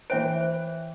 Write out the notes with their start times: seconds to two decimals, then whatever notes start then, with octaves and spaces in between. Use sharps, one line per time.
0.10 E3 C5 C#5 E5 G5 D7
0.41 C5